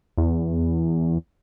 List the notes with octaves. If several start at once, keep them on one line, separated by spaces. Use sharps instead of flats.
E2